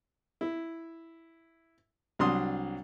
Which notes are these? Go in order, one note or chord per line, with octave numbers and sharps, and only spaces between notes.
E4
C2 F#3 D4 C6 D#6